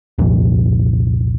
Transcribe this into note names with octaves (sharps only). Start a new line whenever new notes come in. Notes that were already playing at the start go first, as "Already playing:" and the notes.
C2 F2 A#2